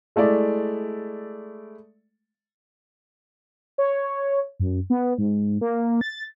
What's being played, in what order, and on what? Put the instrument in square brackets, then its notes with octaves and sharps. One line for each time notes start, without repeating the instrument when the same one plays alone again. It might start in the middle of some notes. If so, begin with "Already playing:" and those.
[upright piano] G#3 A3 E4 D5
[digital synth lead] C#5
F#2
B3
G#2
A#3
A6